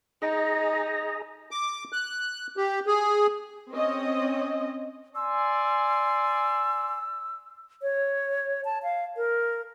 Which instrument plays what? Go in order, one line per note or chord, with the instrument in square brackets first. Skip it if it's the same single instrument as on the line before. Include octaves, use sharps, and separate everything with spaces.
[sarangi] D#4 [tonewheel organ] G#4 D#5 A#5
[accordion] D6
F#6
G4
G#4
[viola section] C4 C#4 D#5
[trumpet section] D5 G#5 C6 [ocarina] E6
[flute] C#5
A5
F5
A#4